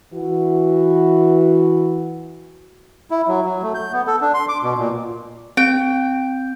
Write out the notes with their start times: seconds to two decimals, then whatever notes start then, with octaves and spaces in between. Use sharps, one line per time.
0.13 E3 F#4
3.11 E4
3.28 F#3
3.46 F#3
3.63 A3
3.75 G6
3.92 B3
4.07 A4
4.21 D4
4.34 C6
4.49 D6
4.63 B2
4.78 A#2
5.57 C4 G5